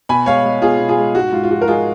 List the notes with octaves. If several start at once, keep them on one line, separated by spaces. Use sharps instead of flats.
B2 G#5 B5
G#3 C#5 F5
G#3
B2 F4 G#4
B2
F4 G#4
G#3
G#2 F#4
G#2 F4
F4
F3 F#4
A#4
G#3 F4 G#4